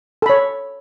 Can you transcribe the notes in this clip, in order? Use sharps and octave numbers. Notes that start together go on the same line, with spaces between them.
A4 C#5 B5